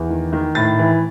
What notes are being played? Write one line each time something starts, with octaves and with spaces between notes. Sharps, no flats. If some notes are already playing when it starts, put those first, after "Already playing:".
Already playing: E2
D#3
D#3
A2 A6
E3